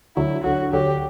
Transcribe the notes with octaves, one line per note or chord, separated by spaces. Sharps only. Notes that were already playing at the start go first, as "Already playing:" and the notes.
D2 D3 F#3 E4
D2 D3 F#3 F#4
D2 D3 F#3 G4